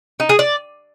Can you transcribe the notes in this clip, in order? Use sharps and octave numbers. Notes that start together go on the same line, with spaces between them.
D#4
G#4
D5